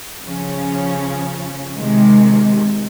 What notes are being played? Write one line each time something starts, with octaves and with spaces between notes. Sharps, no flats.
C#3 F3 C#4
C3 D#3 G#3